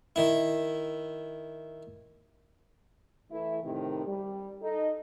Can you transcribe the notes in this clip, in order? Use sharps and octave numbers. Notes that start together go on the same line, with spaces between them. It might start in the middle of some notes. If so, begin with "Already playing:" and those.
D#3 E4
E3 A3 E4
A2 C3 D#3
G3
D#4 A4